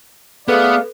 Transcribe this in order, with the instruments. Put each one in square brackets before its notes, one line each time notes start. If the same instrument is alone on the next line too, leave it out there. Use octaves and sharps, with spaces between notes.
[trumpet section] A3 D5 F5 [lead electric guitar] B3 [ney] G#4 [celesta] A4 B4